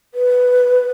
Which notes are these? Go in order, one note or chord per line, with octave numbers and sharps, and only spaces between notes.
B4